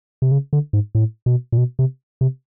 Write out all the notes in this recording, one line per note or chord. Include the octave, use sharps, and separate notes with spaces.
C3
C#3
D3
G#2
A2
B2
A#2
B2
C3
C3